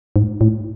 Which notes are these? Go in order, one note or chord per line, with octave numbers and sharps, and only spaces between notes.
G#2
A2